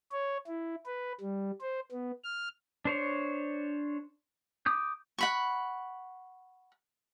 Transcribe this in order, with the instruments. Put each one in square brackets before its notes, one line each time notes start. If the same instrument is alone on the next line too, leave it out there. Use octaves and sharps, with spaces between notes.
[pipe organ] C#5
E4
B4
G3
C5
B3
F6
[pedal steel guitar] D4 C5 C#5
D6 D#6 G6
[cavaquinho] F#5 B5 C#6